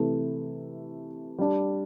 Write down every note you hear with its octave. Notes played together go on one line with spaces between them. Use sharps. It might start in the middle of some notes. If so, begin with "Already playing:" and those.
Already playing: C3 E3 A3
G3 D4 G4